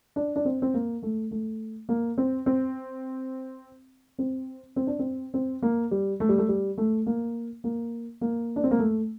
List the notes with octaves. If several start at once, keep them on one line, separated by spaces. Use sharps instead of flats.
D4
D4
C4
C4
A#3
A3
A3
A#3
C4
C4
C4
C4
D4
C4
C4
A#3
G3
A3
G3
A3
G3
A3
A#3
A#3
A#3
D4
C4
A#3
A3